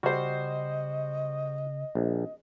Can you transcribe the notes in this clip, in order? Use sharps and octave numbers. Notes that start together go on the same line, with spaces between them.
C#3 G3 F#4 C5 D#5
A#1